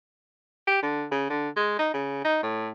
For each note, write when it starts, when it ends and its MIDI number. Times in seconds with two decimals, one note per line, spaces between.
0.67 0.81 67
0.82 1.05 50
1.11 1.26 49
1.30 1.49 50
1.56 1.78 56
1.79 1.90 63
1.94 2.20 49
2.24 2.40 63
2.43 2.70 45